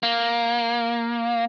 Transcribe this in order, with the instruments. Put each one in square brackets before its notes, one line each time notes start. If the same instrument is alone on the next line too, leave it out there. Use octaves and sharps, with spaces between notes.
[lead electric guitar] A#3